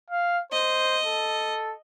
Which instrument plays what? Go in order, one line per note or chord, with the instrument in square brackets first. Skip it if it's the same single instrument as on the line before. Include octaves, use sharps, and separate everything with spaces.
[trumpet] F5
[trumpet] C5 [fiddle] D#5
[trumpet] A4